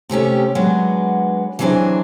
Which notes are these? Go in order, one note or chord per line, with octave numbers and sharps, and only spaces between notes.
C3 A3 C#4 G4
F#3 G#3 B3 D4
E3 F#3 B3 C4 D4 G#4